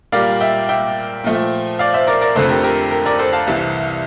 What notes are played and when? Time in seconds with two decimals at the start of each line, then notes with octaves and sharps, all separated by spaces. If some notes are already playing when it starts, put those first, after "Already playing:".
0.12 A#2 G3 A#3 D5 F5
0.40 E5 G5
0.69 E5 G5
1.24 A#2 F3 A3
1.79 D5 F5
1.94 C5 E5
2.07 A#4 D5
2.21 A#4 D5
2.35 F2 D3 A3 A4 C5
2.49 G4 A#4
2.63 G4 A#4
2.91 G4 A#4
3.06 A#4 D5
3.19 A4 C5
3.33 F5 A5
3.47 C2 C3 E3